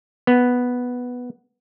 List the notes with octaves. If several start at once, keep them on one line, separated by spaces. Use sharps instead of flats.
B3